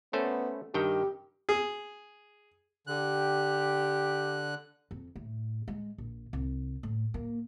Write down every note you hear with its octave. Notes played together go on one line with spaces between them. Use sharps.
A3 B3 C#4 C5
G2 D#3 G4 G5
G#4
D3 G4 F#6
F2
A2
G#3
A#1
C2
A2
A#3